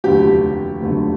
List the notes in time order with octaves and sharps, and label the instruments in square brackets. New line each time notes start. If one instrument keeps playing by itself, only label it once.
[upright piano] F1 D#2 D3 F#3 A3 G4
F1 D#2 D3 F#3 A3